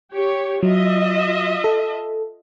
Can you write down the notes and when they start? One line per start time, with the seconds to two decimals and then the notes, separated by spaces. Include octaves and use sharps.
0.12 G4 C#5
0.63 F#3 F4 D#5 E5
1.64 A4